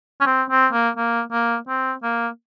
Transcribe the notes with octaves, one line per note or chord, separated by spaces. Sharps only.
C#4
C4
C4
A#3
A#3
A#3
C4
A#3